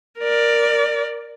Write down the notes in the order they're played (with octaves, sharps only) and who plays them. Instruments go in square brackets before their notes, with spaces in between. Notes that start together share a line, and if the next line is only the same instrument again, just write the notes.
[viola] A#4 D5